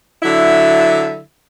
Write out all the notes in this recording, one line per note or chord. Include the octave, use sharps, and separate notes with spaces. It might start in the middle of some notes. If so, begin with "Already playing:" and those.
D3 F#3 E4 E5